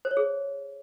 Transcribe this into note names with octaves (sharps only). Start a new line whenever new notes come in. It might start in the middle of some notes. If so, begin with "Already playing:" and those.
C5
C#5
G#4